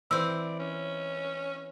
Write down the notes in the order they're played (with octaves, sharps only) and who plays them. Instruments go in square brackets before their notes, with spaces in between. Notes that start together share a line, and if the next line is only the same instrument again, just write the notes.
[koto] E3 C4 [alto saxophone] D5 [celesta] E6
[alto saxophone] C#4